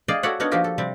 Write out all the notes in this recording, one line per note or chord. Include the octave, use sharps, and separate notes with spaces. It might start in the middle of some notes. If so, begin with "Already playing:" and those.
G#4 D5 D#5 F5 G5
F#4 A4 C#5 D5 E5 F#5
B3 D4 D#4 A#4 C#5 F#5
F3 A#3 D4 F#4 G4 A#4
A4
C3 G3 C4